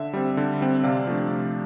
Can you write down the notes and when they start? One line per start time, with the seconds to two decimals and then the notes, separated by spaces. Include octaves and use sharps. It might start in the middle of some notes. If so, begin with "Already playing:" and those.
Already playing: D3 E5
0.13 G3 C4
0.37 D3
0.61 G3 C4
0.84 C3 D5 F5
1.07 F3 A3 D4
1.30 C3